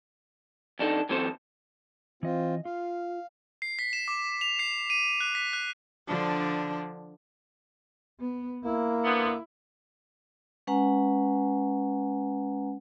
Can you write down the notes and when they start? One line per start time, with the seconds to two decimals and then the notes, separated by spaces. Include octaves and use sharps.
0.79 F2 D4 D#4 A4
1.09 F#2 E3 C4 A4 C5
2.23 E3 C4 F4 D#5
2.65 F4 F5
3.62 C7
3.79 B6
3.93 E7
4.08 D6
4.41 F7
4.59 C7
4.90 D#7
5.20 F#6
5.35 B6
5.53 F#6
6.08 D3 F3 D4
8.20 B3
8.65 A#3 E4
9.05 D3 B3
10.67 G#3 C#4 B4 F#5 G#5 A#5